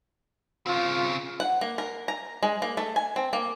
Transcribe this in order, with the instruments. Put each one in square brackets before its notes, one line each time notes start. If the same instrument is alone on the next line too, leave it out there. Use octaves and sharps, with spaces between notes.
[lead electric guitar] C#3 C4 [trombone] F4
[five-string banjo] F#5
A#3
A#4
A#5
G#3
A#3
A3
G#5
C4
A#3